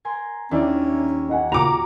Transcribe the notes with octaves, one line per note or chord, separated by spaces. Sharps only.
A#4 G#5 C6
D#2 C#4 D4 E4 D5
D#4 F#5 G#5
A#2 C#3 F#4 A#5 D6